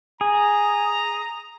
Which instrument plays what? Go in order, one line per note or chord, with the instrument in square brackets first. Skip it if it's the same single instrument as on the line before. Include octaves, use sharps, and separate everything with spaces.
[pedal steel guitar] G#4 [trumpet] A#5